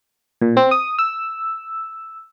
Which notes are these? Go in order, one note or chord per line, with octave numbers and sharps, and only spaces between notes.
A#2
C4
D#6
E6